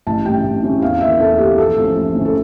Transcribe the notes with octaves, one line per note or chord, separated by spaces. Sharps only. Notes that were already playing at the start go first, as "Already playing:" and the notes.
A1 A5
A2 G3 C#4 G5
A1
A2 G3 C#4
E2 F5
E3 A#3 E5
E2 A4
E3 A#3 G4
A#1 A4
A2 F3 C#4
A#1
A2 F3 C#4
A4